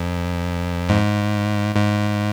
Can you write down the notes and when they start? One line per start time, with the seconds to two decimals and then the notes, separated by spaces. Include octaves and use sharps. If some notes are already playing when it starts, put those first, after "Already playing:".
Already playing: F2
0.89 G#2
1.75 G#2